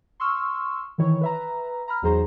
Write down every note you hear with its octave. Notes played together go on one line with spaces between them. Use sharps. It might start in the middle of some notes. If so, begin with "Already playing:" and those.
C6 C#6 E6 F6
D#3 E3 E4 C#5
B4 E5 A#5
A#5 B5 F6
E2 F#3 D#4 G#4 C5 A#5